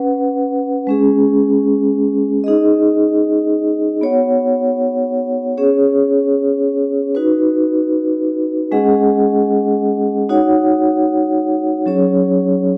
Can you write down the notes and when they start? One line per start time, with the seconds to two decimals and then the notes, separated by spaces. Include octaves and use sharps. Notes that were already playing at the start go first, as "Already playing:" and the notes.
Already playing: C#4 B4 F#5
0.87 G#3 C#4 G#4
2.44 D#4 G#4 D#5
4.01 B3 F#4 C#5 F#5
5.58 C#4 G#4 C#5
7.15 D#4 F#4 B4
8.72 G#3 C#4 G#4 D#5 F#5
10.29 D#4 F#4 C#5 F#5
11.86 F#3 C#4 G#4 C#5